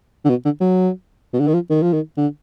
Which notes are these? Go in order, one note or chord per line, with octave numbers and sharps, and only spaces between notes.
D3
B2
D3
F#3
B2
D3
D#3
F3
D#3
F3
D#3
D3